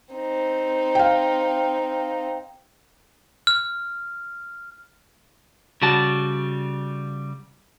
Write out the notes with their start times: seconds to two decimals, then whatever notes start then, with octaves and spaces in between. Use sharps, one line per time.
0.14 C4 D#4
0.95 F5 G5
3.47 F6
5.82 C#3 G3 F#4 A5